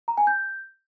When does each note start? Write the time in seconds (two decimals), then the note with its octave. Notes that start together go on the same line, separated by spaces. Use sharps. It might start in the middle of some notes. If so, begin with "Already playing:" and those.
0.08 A#5
0.18 G#5
0.27 G6